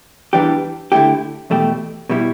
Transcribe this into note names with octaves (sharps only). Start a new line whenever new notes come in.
E2 E3 G3 D4 G4
D3 A3 E4 G4
E2 B2 A3 G4
B2 G3 E4